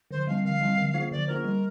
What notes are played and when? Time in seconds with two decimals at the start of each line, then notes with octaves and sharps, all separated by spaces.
0.11 D3 C5
0.27 G3 C4 F5
0.45 D3 F5
0.61 G3 C4
0.78 D3
0.94 A#3 F4 C5
1.12 D3 D5
1.27 A#3 F4 A#4 C5
1.44 G3